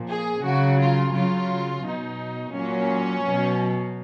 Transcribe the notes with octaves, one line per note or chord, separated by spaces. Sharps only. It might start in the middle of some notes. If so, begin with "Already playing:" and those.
Already playing: A#2 F3
G#4
C#3 F#3 F#4
F4
C#3 F#3 F4
B2 F#3 D#4
A#2 F#3 C#4
B2 F#3